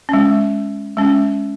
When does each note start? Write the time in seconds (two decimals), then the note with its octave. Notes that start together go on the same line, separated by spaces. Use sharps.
0.09 G#3 C#4
0.97 G#3 C#4